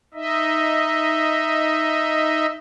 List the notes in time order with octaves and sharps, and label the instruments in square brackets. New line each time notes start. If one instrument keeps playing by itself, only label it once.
[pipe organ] D#4 D#5 E5